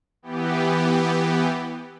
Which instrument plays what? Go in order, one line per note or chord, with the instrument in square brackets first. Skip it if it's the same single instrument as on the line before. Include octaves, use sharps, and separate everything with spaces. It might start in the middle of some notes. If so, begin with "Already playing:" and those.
[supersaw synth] E3 B3 G4